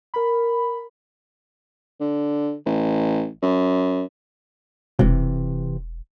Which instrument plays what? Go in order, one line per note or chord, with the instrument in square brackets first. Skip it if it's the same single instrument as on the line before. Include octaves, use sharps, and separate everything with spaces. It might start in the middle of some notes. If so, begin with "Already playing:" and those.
[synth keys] A#4 B5
[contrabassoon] D3
A1
F#2
[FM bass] E1 [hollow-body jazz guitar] C3 E3